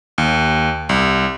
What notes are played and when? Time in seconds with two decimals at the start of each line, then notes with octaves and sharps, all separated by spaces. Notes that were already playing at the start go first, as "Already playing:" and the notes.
0.18 D#2
0.89 C2